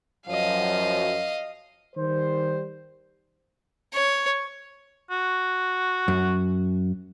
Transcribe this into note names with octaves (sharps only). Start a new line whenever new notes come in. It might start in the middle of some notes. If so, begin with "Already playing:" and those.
F#2 F3 F#3 D#5 F5
D#3 G3 C5
C#5
F#4
F#2